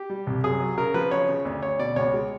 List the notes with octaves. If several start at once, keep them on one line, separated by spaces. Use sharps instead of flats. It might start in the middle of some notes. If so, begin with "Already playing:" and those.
Already playing: G4
G3
C2
F#2 G#4
F#3
C#3 A#4
F3 B4
C#3 C#5
C#3
D2
D2 C#5
B2 D5
C#2 C#5
G#3